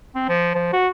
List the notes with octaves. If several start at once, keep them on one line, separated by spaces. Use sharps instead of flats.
C4
F3
F3
F#4